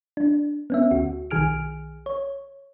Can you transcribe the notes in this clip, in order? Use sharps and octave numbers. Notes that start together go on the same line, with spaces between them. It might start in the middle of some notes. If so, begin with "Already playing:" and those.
D4
B3 C#4 E5
D2 F#4
B1 D#3 G#4 G#5 F6 D7
C#5